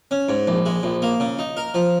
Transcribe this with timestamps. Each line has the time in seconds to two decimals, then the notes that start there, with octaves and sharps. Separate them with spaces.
0.11 C#4
0.29 G#2
0.47 A#1
0.66 G#3
0.83 A#1
1.02 A#3
1.20 C#3
1.39 D#4
1.57 A#4
1.74 F3